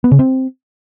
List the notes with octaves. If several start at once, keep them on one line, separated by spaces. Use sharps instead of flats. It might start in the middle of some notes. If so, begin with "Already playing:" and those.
B3
C#3
C4